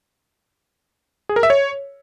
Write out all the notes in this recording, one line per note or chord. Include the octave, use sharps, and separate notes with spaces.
G#4
A#4
E5
C#5